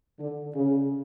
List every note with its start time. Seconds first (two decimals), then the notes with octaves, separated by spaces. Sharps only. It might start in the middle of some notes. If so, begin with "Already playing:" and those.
0.19 D3
0.55 C#3